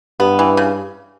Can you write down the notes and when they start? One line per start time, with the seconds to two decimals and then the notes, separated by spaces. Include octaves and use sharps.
0.20 G2 B3
0.39 E3
0.57 C#3